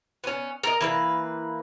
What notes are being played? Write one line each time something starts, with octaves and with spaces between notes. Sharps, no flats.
B3 C#4
A#4 D#5
E3 A#3 B4